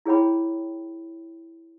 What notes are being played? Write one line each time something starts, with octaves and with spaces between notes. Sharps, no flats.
E4 G#4 C#5 G5 B5